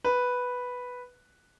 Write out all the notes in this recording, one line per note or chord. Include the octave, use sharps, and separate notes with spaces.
B4